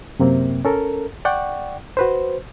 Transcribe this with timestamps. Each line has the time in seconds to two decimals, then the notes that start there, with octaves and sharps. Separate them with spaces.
0.19 F#2 C3 A#3 C4
0.65 C#4 A4 A#4
1.25 D5 F#5 G5 C#6
1.97 F#4 B4 C5